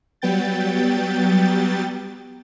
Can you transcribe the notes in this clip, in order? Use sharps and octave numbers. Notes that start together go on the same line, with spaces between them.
F#3 G3 B3 G5 G6 A6